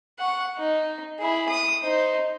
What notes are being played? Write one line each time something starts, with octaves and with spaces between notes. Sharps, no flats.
F#5 C#6
D#4
E4 G#4
D#6
D#4 C5